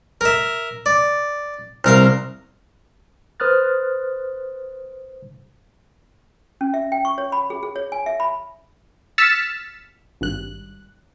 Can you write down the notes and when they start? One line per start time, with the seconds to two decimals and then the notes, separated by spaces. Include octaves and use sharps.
0.21 A#4 E5
0.86 D5
1.84 C2 A#4 F5
3.40 B4 C5 D#6 F6 F#6 A6
6.61 C#4
6.74 E5
6.92 G5
7.05 C#6
7.18 C#5
7.32 B5
7.50 G#4
7.63 G#4
7.76 C#5
7.92 G#5
8.06 E5
8.20 B5
9.18 E6 F6 A6 B6 C#7 E7
10.21 G#1 G2 F#6